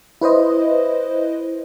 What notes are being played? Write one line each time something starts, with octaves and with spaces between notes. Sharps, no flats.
E4 B4 C5 D#5